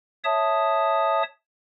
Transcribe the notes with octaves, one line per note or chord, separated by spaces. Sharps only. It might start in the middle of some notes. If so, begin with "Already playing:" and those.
C#5 E5 A5 D#6